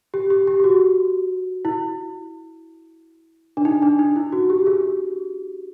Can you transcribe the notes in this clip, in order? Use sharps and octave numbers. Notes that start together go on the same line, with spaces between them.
G4
G4
G4
G4
F#4
E4
D4
D#4
D4
D#4
E4
F#4
G4
G#4